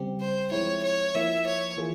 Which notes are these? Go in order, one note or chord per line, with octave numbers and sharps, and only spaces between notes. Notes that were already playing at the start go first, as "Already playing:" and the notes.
Already playing: C#3 G3 C4 G4
C5
F3 G#3 C4 E4 C#5
C#5
F3 A#3 E4 E5
C#5
E3 A#3 F4 G#4